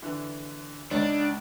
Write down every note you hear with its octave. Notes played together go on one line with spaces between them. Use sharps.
D3 E3
C#2 G#2 D4